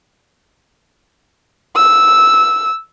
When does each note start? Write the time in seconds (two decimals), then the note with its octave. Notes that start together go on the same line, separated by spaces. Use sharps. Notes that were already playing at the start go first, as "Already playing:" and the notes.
1.76 E6